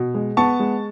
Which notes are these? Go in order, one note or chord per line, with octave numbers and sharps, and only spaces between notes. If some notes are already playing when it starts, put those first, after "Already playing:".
Already playing: B2
G#3
B3 A5 C#6
G#3